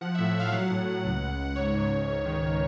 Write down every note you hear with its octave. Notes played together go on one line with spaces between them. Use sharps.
F3 F#5
A2 E5
A2 F5
F#3 F#5
A2
A2
C#2
C#2
C#2
G#2 C#5
G#2
G#2
C#2
D#3